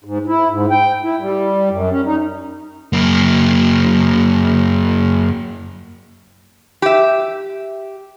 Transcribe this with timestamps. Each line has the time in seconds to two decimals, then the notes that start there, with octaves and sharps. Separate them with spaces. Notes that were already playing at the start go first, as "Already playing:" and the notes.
0.04 G#2
0.27 E4
0.51 G#2
0.70 G5
1.03 E4
1.21 G3
1.70 F#2
1.91 C#4
2.06 D#4
2.93 F#2 A#3
6.82 G4 E5